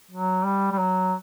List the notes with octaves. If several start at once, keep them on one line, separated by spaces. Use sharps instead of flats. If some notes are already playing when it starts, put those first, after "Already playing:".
F#3
G3
G3
F#3